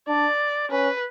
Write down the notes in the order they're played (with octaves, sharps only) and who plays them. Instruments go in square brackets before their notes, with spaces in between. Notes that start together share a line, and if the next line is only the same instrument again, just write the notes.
[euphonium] D4 [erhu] D5
[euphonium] C#4 [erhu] B4